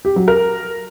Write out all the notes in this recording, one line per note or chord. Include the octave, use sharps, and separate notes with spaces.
G4
F#3
A#4